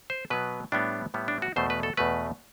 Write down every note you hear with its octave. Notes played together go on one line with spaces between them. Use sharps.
C5
B2 F#3 B3 B4
A2 G3 B3 D4
A2 G3 B3
D4
F#4
E2 B2 A3 C5
B4
A4
E2 B2 A3 B4